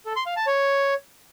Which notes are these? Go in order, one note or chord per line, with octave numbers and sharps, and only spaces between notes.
A4
C6
F5
A5
C#5